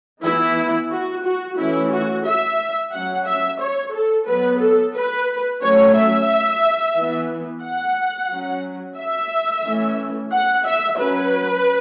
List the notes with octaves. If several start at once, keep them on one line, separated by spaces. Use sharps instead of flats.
E3 B3 E4
F#4
F#4
E3 A3 C#4 E4
F#4
E5
F#3 C#4 F#5
E5
C#5
A4
F#3 B3 B4
A4
B4
F#3 A3 C#4 C#5
E5
E3 B3
F#5
F#3 C#4
E5
E3 A3 C#4
F#5
E5
F#3 C#4 B4